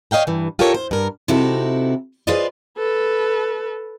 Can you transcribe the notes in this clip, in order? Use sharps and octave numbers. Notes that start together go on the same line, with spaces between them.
C#5 D#5 F5 G5 A#5
G2 E3
F4 G4 A4 A#4 C#5
C5
G2 A#4
C3 C4 D#4 E4 F#4 A4
F4 G#4 B4 C5 D5 D#5
A4 B4